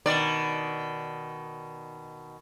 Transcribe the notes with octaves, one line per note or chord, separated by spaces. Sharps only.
B2 D#3 D5